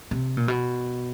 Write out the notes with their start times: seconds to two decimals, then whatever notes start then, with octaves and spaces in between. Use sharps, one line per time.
0.11 C3
0.37 A#2
0.48 B2